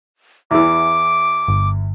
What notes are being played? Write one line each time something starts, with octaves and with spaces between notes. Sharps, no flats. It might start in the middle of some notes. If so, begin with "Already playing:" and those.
E2 E3 D6
G1